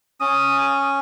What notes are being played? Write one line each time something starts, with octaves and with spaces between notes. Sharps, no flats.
C#4 D#6